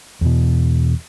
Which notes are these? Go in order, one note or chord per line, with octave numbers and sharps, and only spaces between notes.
E2 B2